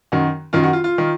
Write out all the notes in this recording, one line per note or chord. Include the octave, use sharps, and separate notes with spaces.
F#2 D#3 F#4
F#2 D#3 F4
F#4
F4
F4
D#3